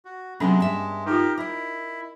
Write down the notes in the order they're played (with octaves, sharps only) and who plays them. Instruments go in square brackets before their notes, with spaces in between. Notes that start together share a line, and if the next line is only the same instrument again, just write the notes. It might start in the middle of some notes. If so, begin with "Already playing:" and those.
[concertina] F#4
[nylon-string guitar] C3 F#3 B3 [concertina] G#3 [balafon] C#4 D4 A4
[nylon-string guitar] G2 E5
[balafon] D#4 F4 [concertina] G4 A#4
[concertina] E4 [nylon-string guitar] A#4 D#5